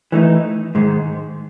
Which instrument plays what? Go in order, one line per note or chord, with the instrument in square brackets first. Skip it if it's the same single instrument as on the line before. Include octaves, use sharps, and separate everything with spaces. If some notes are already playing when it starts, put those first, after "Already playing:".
[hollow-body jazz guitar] E3 A3 D#4
G#2 D#3 G#3